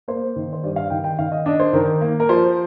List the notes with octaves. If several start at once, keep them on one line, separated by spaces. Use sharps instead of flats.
A#3 C5
D#3
C5
G2 D5
F5
D#3 G5
G5
D#3 F5
D#5
D4 D#5
C5
D#3 A#4
A#3
A#4
F3 C5